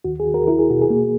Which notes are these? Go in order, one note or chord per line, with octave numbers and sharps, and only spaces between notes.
D#2 F#4
G#4
D#2
F#4 A#4
E4 A#4
G#4
B2 F#4
G#4
A#3